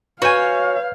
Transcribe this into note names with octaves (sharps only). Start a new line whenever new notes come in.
F#4 B4 C#5 F5 G#5 G6 G#6